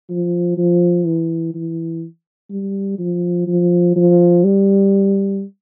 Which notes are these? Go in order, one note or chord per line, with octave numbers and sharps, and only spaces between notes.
F3
F3
E3
E3
G3
F3
F3
F3
G3